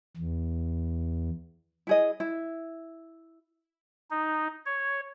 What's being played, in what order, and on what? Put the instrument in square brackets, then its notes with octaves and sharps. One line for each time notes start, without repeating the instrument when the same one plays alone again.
[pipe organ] E2
[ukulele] E4 G#4 D#5
E4
[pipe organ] D#4
C#5